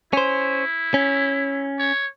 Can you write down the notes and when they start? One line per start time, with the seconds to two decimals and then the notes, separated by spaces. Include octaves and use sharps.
0.13 C#4 E4 C5
0.94 C#4
1.79 C#5